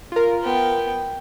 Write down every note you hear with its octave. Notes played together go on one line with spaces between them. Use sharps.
F4 A#4
B3 G5